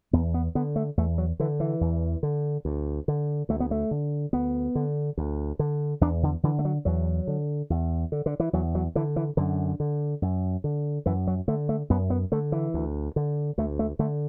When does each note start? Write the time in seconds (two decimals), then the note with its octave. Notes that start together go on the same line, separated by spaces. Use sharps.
0.13 E2 B3
0.34 B3
0.55 D3 B3
0.76 A3
0.97 E2 A3
1.18 F#3
1.40 D3 E3
1.60 E3
1.81 E2
2.23 D3
2.65 D2
3.08 D3
3.49 D2 A3
3.60 B3
3.71 A3
3.91 D3
4.33 D2 B3
4.75 D3
5.18 D2
5.59 D3
6.01 E2 D4
6.23 D3
6.43 D3 E3
6.59 A3
6.65 F#3
6.85 E2 F#3
7.27 D3
7.70 E2
8.12 D3
8.26 D3
8.40 E3
8.53 E2 F#3
8.75 F#3
8.95 D3 E3
9.16 E3
9.37 F#2 D3
9.80 D3
10.22 F#2
10.64 D3
11.06 F#2 E3
11.27 F#3
11.48 D3 A3
11.69 A3
11.90 F#2 B3
12.10 B3
12.32 D3 A3
12.52 E3
12.74 D2
13.16 D3
13.58 D2 A3
13.79 A3
13.99 D3 A3